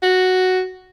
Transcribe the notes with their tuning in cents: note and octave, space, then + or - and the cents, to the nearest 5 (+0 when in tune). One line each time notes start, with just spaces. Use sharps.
F#4 +0